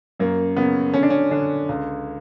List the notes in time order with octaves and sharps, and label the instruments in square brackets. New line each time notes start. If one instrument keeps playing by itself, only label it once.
[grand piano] F#2 A#3
C#3 B3
D3 C#4
D4
C#4
D3 D4
C#2